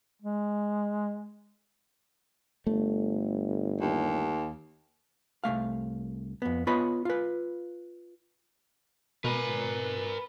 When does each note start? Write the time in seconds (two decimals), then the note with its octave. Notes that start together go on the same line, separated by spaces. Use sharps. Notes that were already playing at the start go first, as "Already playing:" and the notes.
0.22 G#3
2.67 G1 A3
3.81 D#2
5.44 C2 F#3 A3 F5
6.42 F2 B3
6.67 B3 F4 B4 C#5 D#5 B5
7.05 F4 B4
9.25 B2 A#4 B4 G#5